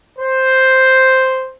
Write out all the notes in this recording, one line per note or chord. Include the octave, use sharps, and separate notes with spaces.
C5